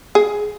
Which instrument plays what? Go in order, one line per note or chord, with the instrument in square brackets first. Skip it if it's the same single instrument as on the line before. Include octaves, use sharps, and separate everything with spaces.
[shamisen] G#4